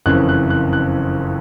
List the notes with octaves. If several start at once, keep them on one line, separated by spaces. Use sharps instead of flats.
F#1 F2 C#3 E3 F#6
F#6
F#6
F#6